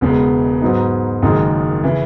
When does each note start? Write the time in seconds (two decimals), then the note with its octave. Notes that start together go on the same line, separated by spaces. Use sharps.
0.01 E1 E2 C#3 G#3 B3
0.61 G#2 F#3 B3 D#4
1.22 F#1 F#2 D#3 G#3 D#4
1.84 C#3 E3